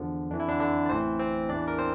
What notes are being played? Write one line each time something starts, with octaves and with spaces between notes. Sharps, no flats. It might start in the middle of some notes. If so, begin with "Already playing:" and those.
Already playing: E2 D3 F3
F2 E3 D4
E4
D3 D4
D3 D4
D5
A1 A2 E3 C4 C5
C4 C5
E2 E3 D4 D5
A#4
C4 C5